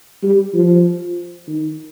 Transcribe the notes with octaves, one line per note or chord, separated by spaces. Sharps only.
G3
F3
D#3